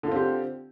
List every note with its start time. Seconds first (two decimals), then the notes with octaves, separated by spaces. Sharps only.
0.03 D3
0.07 F4
0.12 C4
0.16 G4